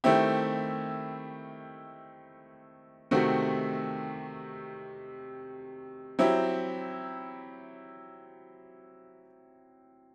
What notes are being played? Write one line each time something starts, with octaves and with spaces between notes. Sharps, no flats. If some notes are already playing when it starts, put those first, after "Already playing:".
D#3 A3 C4 E4 G4
C3 D#3 A3 C4 F#4
F#3 C4 E4 G4